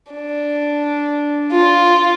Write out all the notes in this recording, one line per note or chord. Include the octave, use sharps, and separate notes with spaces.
D4
F4